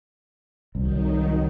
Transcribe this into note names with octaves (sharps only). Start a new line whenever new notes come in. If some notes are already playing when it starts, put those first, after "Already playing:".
C2 D#3 F#3 D#4